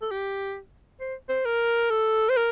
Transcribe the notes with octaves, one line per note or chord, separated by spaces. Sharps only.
A4
G4
C5
C5
A#4
A4
C5
A#4